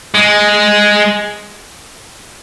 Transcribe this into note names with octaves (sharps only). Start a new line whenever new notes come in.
G#3